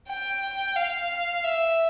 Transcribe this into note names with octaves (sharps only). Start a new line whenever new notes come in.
G5
F5
E5